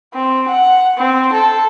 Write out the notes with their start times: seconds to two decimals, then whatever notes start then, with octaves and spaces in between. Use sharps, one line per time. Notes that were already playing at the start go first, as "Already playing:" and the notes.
0.14 C4
0.48 F#5
0.98 C4
1.33 A4